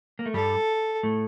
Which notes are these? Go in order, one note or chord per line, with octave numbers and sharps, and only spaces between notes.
A#3
A3
G2 G3 A4
A2 A3